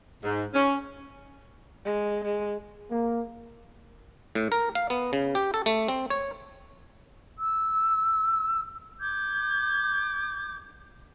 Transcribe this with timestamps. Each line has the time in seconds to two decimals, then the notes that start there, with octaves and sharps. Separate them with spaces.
0.23 G#2
0.54 C#4
1.85 G#3
2.24 G#3
2.91 A#3
4.35 A2
4.52 A#4
4.75 F5
4.90 B3
5.13 C#3
5.35 G4
5.54 A4
5.66 A3
5.88 C4
6.10 C#5
7.39 E6
9.00 D6 G6 G#6